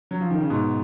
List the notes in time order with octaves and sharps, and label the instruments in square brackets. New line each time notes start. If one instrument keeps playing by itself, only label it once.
[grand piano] F#3
F3
D#3
C#3
G#2 B2